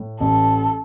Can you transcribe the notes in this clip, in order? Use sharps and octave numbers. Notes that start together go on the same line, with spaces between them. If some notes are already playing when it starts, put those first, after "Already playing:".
Already playing: A2
A1 A4